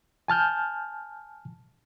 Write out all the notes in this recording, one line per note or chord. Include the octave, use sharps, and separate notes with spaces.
G#5 A5 F6 G6